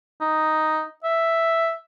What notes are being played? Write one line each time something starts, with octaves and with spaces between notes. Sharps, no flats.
D#4
E5